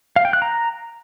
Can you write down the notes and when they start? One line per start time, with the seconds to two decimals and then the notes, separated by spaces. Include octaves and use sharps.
0.16 F5
0.25 G5
0.33 F#6
0.42 A#5